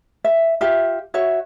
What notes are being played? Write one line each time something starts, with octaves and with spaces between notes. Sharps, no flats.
E5
F4 G4 E5
F#4 C#5 E5